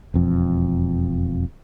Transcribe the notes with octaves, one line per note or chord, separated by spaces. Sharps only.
E1 F2